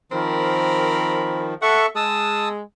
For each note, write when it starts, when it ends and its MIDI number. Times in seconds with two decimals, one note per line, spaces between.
0.12 1.54 51
0.12 1.54 53
0.12 1.48 60
0.12 1.48 70
0.12 1.48 83
1.62 1.86 69
1.62 1.86 76
1.62 1.85 78
1.62 1.86 85
1.96 2.61 56
1.96 2.49 81
1.96 2.49 87
1.96 2.49 88